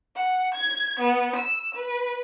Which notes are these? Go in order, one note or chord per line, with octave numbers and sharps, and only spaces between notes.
F#5
G#6
B3
E6
B4